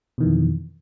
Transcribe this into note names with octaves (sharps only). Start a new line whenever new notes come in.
F2 B2 D#3 E3